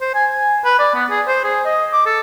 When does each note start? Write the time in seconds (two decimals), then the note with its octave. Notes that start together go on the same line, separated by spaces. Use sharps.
0.01 C5
0.15 G#5
0.31 G#5
0.65 B4
0.79 D5
0.94 B3
1.10 G#4
1.27 C5
1.44 G#4
1.66 D#5
1.93 D6
2.06 A4